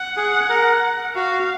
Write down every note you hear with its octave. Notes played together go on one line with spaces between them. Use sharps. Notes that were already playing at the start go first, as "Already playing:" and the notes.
Already playing: F#5
G#4
A#4
F#4 F5